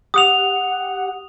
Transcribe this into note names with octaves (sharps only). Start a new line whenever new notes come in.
G4 F#5 D#6 F7